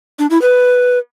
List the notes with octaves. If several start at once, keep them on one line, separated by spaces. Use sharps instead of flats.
D4
E4
B4